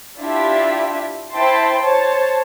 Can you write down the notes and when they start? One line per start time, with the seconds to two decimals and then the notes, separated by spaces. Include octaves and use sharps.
0.20 D4 E4 F4 G4 E5
1.34 E4 C5 E5 G5 A5 C6
1.82 C5 C#5 A5